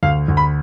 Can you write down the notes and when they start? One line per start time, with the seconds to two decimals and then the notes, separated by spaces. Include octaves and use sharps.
0.03 D2 F5
0.28 D2
0.37 B5